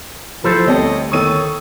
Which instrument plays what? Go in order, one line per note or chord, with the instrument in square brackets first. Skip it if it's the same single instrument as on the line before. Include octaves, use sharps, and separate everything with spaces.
[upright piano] F3 [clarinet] E4 [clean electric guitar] A4 C5
[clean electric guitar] D2 [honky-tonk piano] G3 C4 A4 [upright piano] C#5 [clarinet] D#5
[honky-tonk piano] D#3 C#5 C#6 [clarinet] A4 [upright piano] D#6 D#7